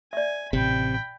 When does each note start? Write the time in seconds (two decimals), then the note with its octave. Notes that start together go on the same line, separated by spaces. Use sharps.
0.13 D5 E5 G#5
0.53 A1 C3 G5 B5